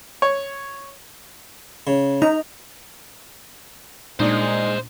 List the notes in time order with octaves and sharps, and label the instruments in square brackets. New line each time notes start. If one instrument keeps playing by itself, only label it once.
[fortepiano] C#5
[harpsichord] C#3
[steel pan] D#4 [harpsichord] A#5
[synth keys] A#2 A#3 [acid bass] G#3 [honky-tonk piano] D4 D#4 [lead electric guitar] C5 D#5